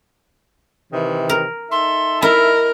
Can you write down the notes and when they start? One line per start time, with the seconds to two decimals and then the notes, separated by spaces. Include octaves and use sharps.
0.93 C3 D#3 E3
1.29 A#4
1.71 D#4 A4 E5 C6
2.22 E4 A#4 D#5